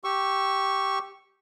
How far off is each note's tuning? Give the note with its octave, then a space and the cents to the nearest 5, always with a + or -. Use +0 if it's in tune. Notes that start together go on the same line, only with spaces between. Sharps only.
G4 -5 C#6 -5 E6 +0